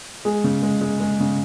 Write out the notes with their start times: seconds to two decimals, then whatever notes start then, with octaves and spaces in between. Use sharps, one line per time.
0.25 G#3 G#4
0.44 C#3
0.63 G#3
0.81 G#3
1.00 G#3
1.20 C#3